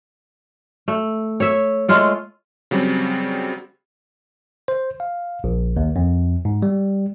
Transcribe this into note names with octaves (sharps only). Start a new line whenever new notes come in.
A3
C#5 E5
G#3 A3 F4 C#5
C#3 F#3 G3 C4
C5
F5
A#1
D#2
F2
G#2
G3